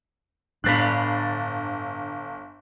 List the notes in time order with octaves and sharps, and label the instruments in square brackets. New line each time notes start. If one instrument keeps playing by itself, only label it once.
[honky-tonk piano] G1 F#6 [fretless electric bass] A2 G3 B3 [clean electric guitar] D4 D5 B5